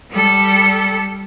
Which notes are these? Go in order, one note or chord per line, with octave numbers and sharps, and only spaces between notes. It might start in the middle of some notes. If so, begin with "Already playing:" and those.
G3 A4